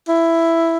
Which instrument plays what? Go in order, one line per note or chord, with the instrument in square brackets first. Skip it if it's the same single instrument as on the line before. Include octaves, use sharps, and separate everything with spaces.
[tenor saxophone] E4